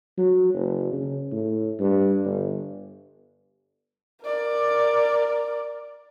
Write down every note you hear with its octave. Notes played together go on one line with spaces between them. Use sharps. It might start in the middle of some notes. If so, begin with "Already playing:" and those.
F#3
F#1
C#3
A2
G2
G1
A#4 D5